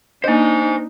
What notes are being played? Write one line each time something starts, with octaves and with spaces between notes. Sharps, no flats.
A#3 D4 D#4 C5 D#5 G#5